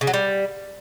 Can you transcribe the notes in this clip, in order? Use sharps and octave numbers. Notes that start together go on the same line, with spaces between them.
C#3
F#3
G3